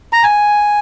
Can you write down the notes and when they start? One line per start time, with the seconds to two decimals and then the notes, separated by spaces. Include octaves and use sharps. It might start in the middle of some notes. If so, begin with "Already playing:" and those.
0.13 A#5
0.23 G#5